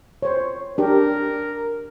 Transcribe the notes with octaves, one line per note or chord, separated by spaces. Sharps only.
C5 C#5
D4 G4 A#4